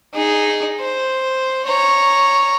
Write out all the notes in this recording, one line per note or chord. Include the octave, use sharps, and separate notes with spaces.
D#4 G#4
C5
C#5 A#5